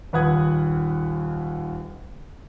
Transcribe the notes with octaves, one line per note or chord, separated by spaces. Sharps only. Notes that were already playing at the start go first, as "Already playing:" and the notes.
D#1 D#2 B4 F#5 D#6 G#6